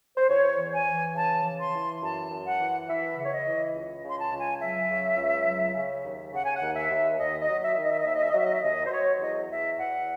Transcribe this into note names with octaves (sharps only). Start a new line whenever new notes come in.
C5
E2 C#5
E3
G#5
E3
C#3 A5
E3
C6
E3
F#2 A5
F#2
F#5
E3
E3 E5
C#3
C#5
D#5
E3
C#2
C#3 C6
A5
C#2
G#5
F#3 E5
C#3
C#2
F#3
C#3
D#2
C#3 F#5
G#5
F#5
D#2
E5
D#2
D#2 D#5
D#5
F#3
E5
D#3
D#5
E5
D#5
D#2 E5
D#5
E5
D#5
F#3
E5
D#5
E5
D#2 D#5
C5
F#3 C#5
E2 D#5
E2 E5
E2 F#5